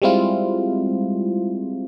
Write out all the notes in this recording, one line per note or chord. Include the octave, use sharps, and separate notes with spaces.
G3 G#3 C4 E4 F4